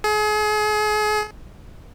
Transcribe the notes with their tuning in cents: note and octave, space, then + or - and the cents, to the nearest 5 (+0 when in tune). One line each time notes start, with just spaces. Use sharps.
G#4 +35